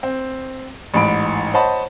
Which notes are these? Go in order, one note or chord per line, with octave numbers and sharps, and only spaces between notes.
C4
A1 G#2 B5 D7
C5 C#5 D#5 F#5 A5 B5